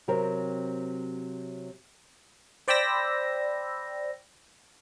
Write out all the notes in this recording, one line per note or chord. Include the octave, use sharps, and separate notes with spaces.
C3 F#3 C4 A#4
C5 D5 G5 B5 E6 A#6